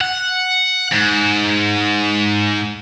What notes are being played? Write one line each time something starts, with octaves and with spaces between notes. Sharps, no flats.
F#5
G#2